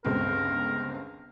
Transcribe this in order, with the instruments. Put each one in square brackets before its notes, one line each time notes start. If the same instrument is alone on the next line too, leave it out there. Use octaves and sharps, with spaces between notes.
[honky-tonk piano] G1 C#2 C4 [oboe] A#4